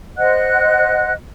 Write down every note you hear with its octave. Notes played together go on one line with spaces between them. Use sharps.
C5 D#5 F#5 F#6